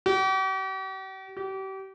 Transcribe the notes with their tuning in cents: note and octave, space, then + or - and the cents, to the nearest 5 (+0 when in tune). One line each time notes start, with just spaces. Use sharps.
G4 -45
G4 -35